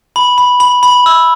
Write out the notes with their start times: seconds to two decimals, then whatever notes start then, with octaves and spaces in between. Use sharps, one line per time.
0.16 B5
0.38 B5
0.60 B5 F#7
0.83 B5
1.06 E6